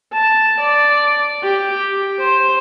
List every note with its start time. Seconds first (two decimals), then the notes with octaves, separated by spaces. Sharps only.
0.13 A5
0.60 D5
1.43 G4
2.19 C5